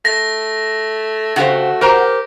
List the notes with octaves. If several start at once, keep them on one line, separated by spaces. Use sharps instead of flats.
A3 A#6
C#3 A3 F#4 G4 C5
G4 A#4 C5 A#5